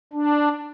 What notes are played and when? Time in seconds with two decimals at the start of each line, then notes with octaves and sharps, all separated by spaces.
0.13 D4